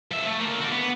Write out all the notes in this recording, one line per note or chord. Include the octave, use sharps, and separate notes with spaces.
F3 E5
A3
D3 A#3
F#4 D5
B3